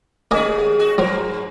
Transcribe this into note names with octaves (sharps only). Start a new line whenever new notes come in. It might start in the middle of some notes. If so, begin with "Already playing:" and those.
D#2 A#3 C#4 G#4 D#5 G#5
F#4 G#4
G2 B2 F#3 A#4 C5